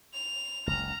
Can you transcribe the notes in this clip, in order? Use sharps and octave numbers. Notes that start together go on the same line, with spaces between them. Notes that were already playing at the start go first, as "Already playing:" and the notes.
F7
F#1 C#2 A#5 F6